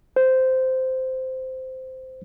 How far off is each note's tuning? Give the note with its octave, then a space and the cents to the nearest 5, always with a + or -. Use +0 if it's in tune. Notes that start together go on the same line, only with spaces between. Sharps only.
C5 -10